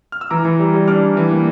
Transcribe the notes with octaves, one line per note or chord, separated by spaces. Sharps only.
F6
E6
E3 A#5 D6
E3
G3
G3
D4 D6 F6
E3
E3
A#3